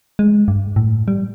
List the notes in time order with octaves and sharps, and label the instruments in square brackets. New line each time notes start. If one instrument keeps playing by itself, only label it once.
[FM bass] G#3
G2
A2
G3